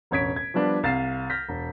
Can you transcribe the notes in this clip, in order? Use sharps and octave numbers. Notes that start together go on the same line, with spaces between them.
E1 A1 C#5 G#6 B6 D7
G#6
F3 G3 B3 D4
C2 F5 A6 C7 E7
F6 G6 A#6 B6
E1